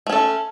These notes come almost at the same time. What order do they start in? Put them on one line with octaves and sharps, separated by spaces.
A3 C#4 A4